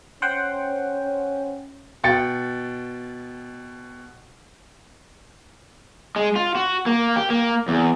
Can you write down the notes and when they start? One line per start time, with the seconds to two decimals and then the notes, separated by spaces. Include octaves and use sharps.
0.22 C#4 C5 F#5 G5
2.04 B2 G5 A6 C#7
6.16 G#3
6.36 F4
6.55 F#4
6.86 A#3
7.16 G4
7.30 A#3
7.68 E2